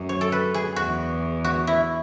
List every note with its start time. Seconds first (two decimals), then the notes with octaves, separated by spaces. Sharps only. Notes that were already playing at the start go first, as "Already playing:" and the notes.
Already playing: F#2
0.09 C#5
0.21 A4
0.32 B4
0.54 G#4
0.76 E2 F#4
1.44 F#4
1.67 E4